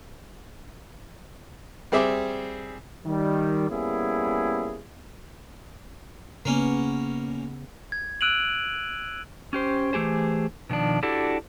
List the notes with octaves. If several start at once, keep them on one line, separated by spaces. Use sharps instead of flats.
G3 C4 G#4 E5 D6
D#3 G3
G3 A#3 B3 C#4 E4 G#4
C#3 A#3 B3 C#4
G#6
E6 F#6 D7 D#7 F7 F#7
C#4 G4 C5
E3 A3 G4 G#4 C5
B2 D#3 F3 D4
D4 E4 F#4 G4 A4